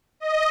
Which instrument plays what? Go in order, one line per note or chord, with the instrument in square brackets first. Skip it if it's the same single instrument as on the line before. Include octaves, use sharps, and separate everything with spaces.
[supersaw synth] D#5